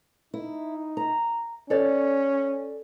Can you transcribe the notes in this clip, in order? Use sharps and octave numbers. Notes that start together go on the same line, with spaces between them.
D#4 E4
A#5
C#4 A4 C#5 D5